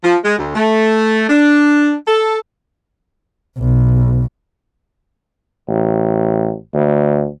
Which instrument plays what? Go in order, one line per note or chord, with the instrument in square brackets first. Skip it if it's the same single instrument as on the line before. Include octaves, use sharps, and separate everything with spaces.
[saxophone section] F3
G#3
D2
A3
D4
A4
[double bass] B1
[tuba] A1
D2